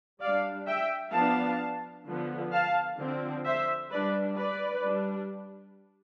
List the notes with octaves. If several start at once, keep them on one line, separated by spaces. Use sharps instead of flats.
G3 D4 D5 F5
E5 G5
F3 B3 D4 F5 A5
D3 F3 B3
F5 A5
D3 F3 C4
C5 E5
G3 D4 B4 D5
B4 D5
G3 D4